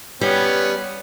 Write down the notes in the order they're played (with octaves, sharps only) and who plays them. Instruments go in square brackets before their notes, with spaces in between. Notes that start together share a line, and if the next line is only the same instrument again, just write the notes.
[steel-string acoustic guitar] G3 [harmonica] B3 C#4